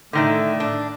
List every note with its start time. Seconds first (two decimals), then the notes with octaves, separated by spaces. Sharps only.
0.13 A2 D3 D#3 A3 D5 E5
0.60 D4